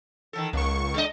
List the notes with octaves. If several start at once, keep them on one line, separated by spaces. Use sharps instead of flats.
D#3 E3 A4
C#2 A#3 C#6
G#3 D4 D#5